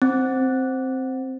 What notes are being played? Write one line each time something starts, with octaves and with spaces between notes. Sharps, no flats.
C4